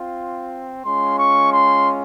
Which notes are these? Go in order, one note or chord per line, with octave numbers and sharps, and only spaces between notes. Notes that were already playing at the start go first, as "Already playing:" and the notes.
Already playing: C4 F4
G#3 C#4 F4 C6
C#6
C6